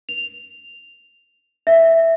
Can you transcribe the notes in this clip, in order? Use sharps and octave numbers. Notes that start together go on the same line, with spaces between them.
F7
E5